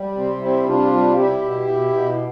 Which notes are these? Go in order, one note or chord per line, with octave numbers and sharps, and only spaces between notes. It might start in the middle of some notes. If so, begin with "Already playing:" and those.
Already playing: G3
C3 C4
G3 C4 E4
C3 D4 F4
G3
G3 E4 G4
B2
B2
B2